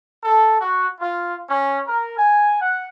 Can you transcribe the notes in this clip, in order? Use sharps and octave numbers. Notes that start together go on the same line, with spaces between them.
A4
F#4
F4
C#4
A#4
G#5
F#5